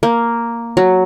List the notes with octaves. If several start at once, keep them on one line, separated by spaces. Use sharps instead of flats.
A#3
F#3